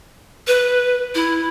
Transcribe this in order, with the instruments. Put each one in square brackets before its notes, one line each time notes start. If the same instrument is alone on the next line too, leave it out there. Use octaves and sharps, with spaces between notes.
[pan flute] B4
E4